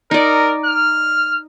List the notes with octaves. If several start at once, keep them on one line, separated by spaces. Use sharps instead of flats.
D#4 A#4 D5
F6